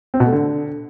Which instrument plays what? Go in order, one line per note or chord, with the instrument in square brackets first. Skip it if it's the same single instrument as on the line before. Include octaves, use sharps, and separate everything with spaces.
[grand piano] C4
B2
A3
D3